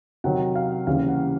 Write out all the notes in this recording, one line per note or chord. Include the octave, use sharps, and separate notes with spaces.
C3 D#3 F#3 F#5
F5
D#2 C#3 E3 G3 F5
F#5